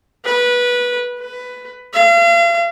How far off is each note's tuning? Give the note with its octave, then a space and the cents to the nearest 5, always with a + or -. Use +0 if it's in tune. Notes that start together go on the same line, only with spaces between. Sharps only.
B4 -15
B4 +10
F5 -40